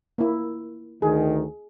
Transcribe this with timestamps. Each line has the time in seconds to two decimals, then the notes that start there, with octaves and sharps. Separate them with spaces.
0.18 A#3 E4
1.02 D2 D#3 G#4